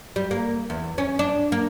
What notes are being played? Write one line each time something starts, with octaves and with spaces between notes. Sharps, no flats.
G3
A#3
E2
C#4
D4
A#3